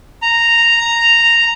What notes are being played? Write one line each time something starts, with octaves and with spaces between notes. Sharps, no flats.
A#5